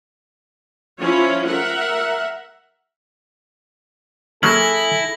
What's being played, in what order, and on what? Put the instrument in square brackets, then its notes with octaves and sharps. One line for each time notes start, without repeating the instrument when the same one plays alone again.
[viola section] F3 C#4 E4 C#5
A#4 E5 F#5
[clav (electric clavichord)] F#3 A#3 C#4 [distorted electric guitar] E4 [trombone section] G#4 A4 [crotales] A#6 F#7